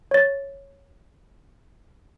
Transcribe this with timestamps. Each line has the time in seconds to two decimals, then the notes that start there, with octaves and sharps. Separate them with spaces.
0.11 C#5 A6